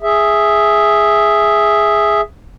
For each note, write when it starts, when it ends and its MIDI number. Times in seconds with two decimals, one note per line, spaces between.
0.02 2.21 68
0.02 2.21 76